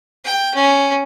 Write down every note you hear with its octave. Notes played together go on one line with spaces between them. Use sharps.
G5
C#4